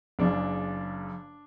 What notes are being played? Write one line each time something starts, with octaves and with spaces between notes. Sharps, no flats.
F#1 F#2 C#3 D4